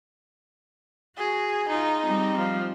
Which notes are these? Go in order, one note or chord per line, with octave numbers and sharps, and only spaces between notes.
F#4 G#4
D#4 F4
G3 C4
F3